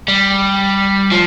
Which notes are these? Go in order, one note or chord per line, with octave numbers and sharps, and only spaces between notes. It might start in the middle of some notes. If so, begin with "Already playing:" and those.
G3
F3